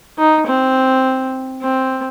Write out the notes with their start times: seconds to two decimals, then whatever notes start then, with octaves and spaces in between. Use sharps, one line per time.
0.18 D#4
0.47 C4
1.62 C4